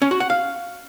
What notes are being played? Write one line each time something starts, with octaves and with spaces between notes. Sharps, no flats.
C#4
F#4
F#5
F5